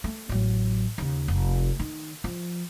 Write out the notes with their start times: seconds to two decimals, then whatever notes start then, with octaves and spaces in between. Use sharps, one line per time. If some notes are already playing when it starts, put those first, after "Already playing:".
0.04 A3
0.29 A1 F#3
0.98 D#2 C#3
1.28 F1
1.79 D#3
2.24 F3